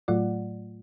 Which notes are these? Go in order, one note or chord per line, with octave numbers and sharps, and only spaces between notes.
A2 F#3 A3 F4 D5 F#5